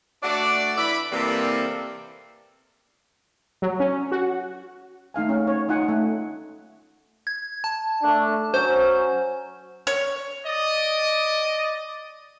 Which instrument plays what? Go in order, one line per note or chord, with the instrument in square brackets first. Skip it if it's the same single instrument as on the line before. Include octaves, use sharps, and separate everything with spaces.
[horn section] A3 D4 F#4 D5
E3 D5 E5 B5
C3 E3 G3 A#3 C4 A4
[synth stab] F#3
C#4
F#4
[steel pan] A3 D#4 F5 G#5
C#4 F#5
C#5
C#4 D#4 F4 F#5 G#5
A3
[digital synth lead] G#6
A5
[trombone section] A3 D4
[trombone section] F#3 C#4 [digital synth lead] C5
[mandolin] C#5
[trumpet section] D5 D#5